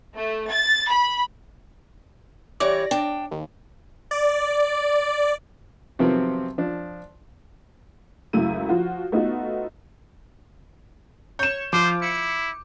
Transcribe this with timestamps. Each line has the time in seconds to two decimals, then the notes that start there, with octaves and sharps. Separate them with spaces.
0.16 A3
0.49 A6
0.89 B5
2.60 E3 G3 C#5 D5 A#6
2.91 D4 G5
3.31 D#2
4.11 D5
5.99 C3 D#3 F3 F#3 B3 C4
6.58 F3 D4
8.33 C#2 F#2 A3 E4 D#7
8.69 F3 F4 F#4
9.12 A3 B3 D#4 F4 F#4
11.39 C#5 G6 E7
11.73 F3 F4 C5 D6
12.02 E4 C#7